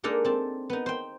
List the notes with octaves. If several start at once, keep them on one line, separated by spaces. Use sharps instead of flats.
G#3 A#3 D4 D#4 A4 A#4
C4 A5
B3 D#4
C5 G5